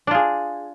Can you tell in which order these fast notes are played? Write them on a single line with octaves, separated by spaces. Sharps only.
D4 F4 G#4